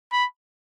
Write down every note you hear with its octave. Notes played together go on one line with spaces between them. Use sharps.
B5